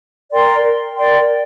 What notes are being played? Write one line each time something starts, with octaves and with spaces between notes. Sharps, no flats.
A#4 D5 G5 C6
A#4 D5 G5 C6